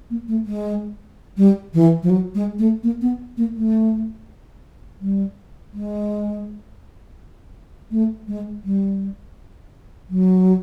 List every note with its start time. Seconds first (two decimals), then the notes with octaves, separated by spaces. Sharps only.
0.10 A#3
0.28 A3
0.46 G#3
1.37 G3
1.74 E3
2.03 F3
2.10 F#3
2.35 G#3
2.59 A3
2.83 A#3
3.01 B3
3.37 A#3
3.55 A3
5.01 G3
5.74 G#3
7.91 A3
8.28 G#3
8.64 G3
10.10 F#3